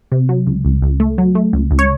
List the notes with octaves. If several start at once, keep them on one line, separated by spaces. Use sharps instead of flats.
C3
F#3
C#2
C#2
C#2
A3
F#3
A3
C#2
C#2
C#5